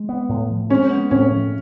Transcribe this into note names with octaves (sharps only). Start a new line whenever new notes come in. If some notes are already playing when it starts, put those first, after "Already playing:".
Already playing: G#3
B3
A2
F3
G#3 C#4
B3
A2 C#4
F3